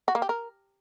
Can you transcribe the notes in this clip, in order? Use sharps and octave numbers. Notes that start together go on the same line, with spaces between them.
F#4
A#3
G4
A#4